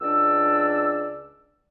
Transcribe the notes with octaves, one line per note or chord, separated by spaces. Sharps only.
C#2 D4 D5 E6